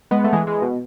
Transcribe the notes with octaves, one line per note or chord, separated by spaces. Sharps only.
G#3 B3
A3
E3 G#3
E3 G#3
B2